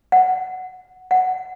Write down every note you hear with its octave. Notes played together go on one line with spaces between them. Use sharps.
F#5
F#5